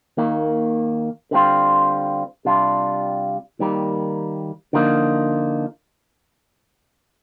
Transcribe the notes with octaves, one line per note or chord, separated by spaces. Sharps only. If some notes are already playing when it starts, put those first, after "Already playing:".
D#2 D#3 A#3
D3 G3 C4 F4
C3 G3 D4 F4
D#2 D#3 G3 A#3
D3 F3 A#3 D#4